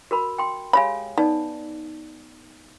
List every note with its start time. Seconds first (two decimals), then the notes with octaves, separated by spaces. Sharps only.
0.11 F#4 A#4 B5
0.38 G5 C6
0.73 G#3 G4 C#5 F5 G#5 B5
1.18 B3 D#4 D5 A5